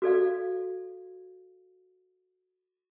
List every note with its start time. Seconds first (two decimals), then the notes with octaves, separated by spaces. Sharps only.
0.02 F#4 A4 D5 F5